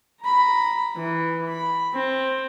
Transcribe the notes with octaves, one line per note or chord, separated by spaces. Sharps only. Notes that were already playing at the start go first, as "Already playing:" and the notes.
A#5 B5
E3
B5
C4